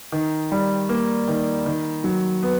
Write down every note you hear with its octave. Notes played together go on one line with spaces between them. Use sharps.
D#3
G3
A#3
D#3
D#3
F#3
B3